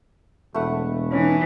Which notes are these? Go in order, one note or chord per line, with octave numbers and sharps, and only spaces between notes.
E1 A3 B4 F#5
E3 C#4 D#4